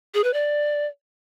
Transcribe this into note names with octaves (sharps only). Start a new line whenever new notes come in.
G#4
B4
D5